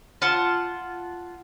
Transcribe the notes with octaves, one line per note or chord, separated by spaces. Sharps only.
F4 F#5 A5